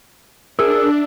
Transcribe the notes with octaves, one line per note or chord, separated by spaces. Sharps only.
D4 G#4 A#4 E5